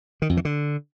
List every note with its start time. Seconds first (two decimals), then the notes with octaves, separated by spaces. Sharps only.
0.22 D#3
0.29 F2
0.37 E3
0.45 D3